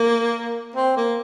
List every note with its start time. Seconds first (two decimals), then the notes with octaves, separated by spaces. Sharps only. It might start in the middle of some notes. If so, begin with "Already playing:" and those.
Already playing: A#3
0.76 C4
0.97 A#3